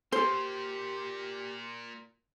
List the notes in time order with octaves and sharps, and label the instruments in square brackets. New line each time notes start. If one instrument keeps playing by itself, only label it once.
[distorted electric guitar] A#2 [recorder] G4 [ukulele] C5